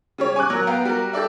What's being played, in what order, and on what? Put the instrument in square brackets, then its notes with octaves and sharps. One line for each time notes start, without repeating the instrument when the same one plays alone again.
[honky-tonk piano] C#3 G3 C#5
G#5 C#6 D6 F#6
F#3 A#4
B3 F5 G5 A#5
G3 F#4 A#4
G4 A4 D5 E5